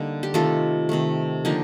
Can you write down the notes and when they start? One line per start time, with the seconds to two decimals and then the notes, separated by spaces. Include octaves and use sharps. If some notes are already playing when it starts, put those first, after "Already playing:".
Already playing: D3 G3 A#3 D#4
0.23 G4
0.34 C3 D#3 A3 F4 A4
0.89 C3 D#3 A3
1.45 D3 F3 A#3 D#4 G4